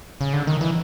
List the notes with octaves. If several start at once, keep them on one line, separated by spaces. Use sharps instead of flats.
C#3
D3
D#3
E3